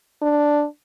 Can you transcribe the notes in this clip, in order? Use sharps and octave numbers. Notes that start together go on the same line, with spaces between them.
D4